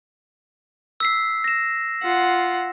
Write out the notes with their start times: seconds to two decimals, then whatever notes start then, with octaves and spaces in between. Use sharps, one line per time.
1.00 E6 B6 C7
1.44 A#6 E7
2.02 F4 F#5